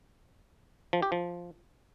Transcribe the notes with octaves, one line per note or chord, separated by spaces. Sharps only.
F3
G4
F3